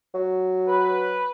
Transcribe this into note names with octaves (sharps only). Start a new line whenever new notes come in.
F#3
B4